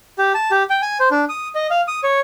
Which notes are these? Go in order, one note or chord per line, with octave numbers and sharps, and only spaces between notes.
G4
A5
G4
G5
G#5
C5
D4
D#6
D#5
F5
D#6
C#5